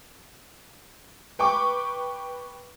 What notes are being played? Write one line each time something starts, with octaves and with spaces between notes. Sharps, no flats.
B4 G5 C#6 D6